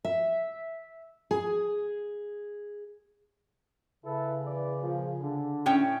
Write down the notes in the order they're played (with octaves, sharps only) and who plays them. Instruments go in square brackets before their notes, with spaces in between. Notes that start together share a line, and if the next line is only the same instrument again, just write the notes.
[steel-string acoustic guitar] E5
G#4
[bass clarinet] C#3 [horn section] E4 A4 B4
[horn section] E3 B4 D5
A#2 F3
D3
[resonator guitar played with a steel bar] A2 C#4 G5